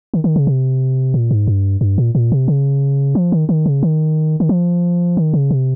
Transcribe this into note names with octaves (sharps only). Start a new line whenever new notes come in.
D#3
D#3
C#3
C3
A#2
G#2
G2
G2
A#2
A#2
C3
C#3
F3
D#3
D#3
C#3
D#3
D#3
F3
D#3
C#3
C3